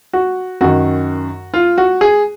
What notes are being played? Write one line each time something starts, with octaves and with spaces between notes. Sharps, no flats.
F#4
F#2 D#3 F#4
F4
F#4
G#4